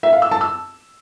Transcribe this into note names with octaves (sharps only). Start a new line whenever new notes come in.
E5
F5
E6
A5
E6